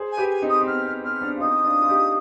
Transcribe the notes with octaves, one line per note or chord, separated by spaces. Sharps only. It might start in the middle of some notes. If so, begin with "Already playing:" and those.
Already playing: G#4 C5
G#5
G4 B4
G#5
C4 D#4
D#6
C4
B3 F6
C4
C4 F6
B3 D4
F4
C4 D#4 D#6
D4 F4
F4
D#4 G4